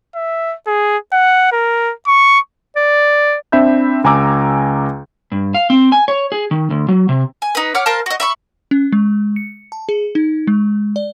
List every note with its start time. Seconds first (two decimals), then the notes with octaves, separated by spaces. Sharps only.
0.15 E5
0.67 G#4
1.13 F#5
1.52 A#4
2.07 C#6
2.76 D5
3.52 C4 D4 E5 B5 G6
4.04 C#2 G#5 A#5 D6 E6
5.32 G2
5.54 F5
5.70 C4
5.92 G#5
6.08 C#5
6.32 G#4
6.51 D#3
6.70 D2
6.88 F#3
7.09 C3
7.42 G#5
7.55 D#4 B4
7.75 C#5 F#5 D6 F6
7.86 A#4 C5 F5 A5
8.06 F#4 D#5
8.20 E5 B5 C#6
8.71 C#4
8.92 G#3
9.36 C#7
9.72 A5
9.89 G#4
10.15 D#4
10.47 G#3
10.96 D5